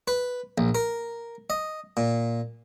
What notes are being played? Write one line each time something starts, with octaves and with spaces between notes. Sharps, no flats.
B4
A#1
A#4
D#5
A#2